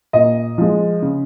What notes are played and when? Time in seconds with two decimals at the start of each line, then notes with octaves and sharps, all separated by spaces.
0.13 A#2 D#5
0.58 F3 G#3
1.02 C#3